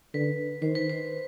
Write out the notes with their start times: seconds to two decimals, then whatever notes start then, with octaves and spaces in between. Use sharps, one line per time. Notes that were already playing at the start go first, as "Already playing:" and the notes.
0.14 D3 B4
0.62 D#3 C5
0.75 B4
0.89 C5